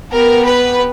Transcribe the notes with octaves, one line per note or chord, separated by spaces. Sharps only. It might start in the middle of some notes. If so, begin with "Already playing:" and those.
B3 G4 A#4
B4